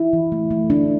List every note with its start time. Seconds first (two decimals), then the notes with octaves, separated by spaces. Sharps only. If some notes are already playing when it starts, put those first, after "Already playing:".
Already playing: E4
0.13 E3
0.32 A3
0.51 A3
0.70 D4